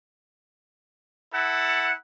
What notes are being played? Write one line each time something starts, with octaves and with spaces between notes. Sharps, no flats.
E4 A4 F#5